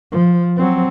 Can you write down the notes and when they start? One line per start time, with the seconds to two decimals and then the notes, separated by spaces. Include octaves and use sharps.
0.12 F3
0.57 F#3 C4